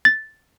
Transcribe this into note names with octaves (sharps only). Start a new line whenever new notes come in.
A6